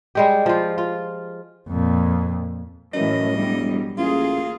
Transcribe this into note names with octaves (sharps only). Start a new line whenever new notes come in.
G3 G#3 G4
F3 F4
F4
F2 A#2
F#2 A2 E3 D#5
E1 F#3 G3
A1 A#3 F4 G#4